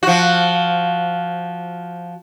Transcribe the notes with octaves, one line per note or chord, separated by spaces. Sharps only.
F3 F#4